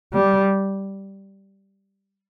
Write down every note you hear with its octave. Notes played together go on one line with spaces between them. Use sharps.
G3